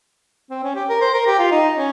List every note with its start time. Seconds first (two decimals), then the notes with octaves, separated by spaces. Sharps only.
0.50 C4
0.63 C#4
0.75 G4
0.89 A#4
1.01 C5
1.14 A#4
1.27 G4
1.39 F4
1.51 D#4
1.77 C#4